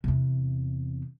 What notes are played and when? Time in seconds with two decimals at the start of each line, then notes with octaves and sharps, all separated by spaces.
0.04 E2 C3